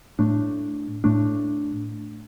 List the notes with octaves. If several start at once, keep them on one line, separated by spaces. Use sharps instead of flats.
A2 A3 D4
A2 A3 D4